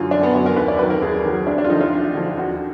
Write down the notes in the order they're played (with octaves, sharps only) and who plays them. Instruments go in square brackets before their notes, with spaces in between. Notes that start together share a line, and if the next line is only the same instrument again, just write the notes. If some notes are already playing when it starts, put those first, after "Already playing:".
Already playing: [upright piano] F#2 D3 F#3 F4 F#4
F#2 D4
B3
D3 F#3 D4
A#4
D#2 B4
D5
D#3 F#3 B4
A#4
D#2 G#4
D#3 F#3
D2 D4
D4
F4
D3 F3 D#4
F4
D2
D3 F3
D#2 F#4